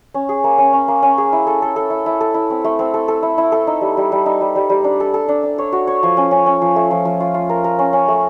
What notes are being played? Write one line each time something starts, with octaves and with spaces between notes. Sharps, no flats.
C#4
G#4
A#3
C#4
C#4
A#3
C#4
G#4
E4
A4
A4
A4
E4
E4
A4
E4
C4
A3
C4
A4
A4
E4
E4
A4
D#4
G3
G3
G3
D#4
G3
G3
G3
D4
A4
A4
D4
D4
C#5
F#4
C#5
F3
C#4
C#4
C#4
F3
A3
F3
F3
F4
F4
A#4
A#4
C#4
C#4
A3